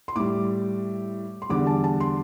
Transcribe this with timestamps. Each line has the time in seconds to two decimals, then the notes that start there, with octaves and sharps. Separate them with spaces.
0.08 C6
0.16 A2 G3 D6
1.42 C6
1.49 E2 D3 G3 D6
1.67 A5
1.84 A5
2.00 C6